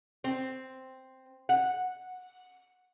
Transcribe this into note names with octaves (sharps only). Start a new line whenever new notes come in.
C4
F#5